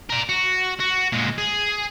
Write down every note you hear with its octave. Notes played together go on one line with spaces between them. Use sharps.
A#4 D5
F#4
F#4
A#2 G#3
G#4